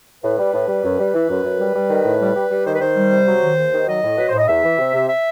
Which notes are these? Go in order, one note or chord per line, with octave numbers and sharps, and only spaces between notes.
A2 B4
G3
A2
G3
F#2
G3
E3
F#2
F#2
G3
G3
D#3
A2
G3
G3
G3
D#3 C5
B4
D#3 C5
G3
C3
F#3
D#3
D#2
D#3
F#3 D#5
A2
F#3 B4
A2 C5
D#5
E2 E5
E3
C3
C3
E5